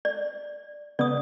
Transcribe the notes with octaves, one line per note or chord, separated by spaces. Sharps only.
D5
C#3 B3 D5 D#6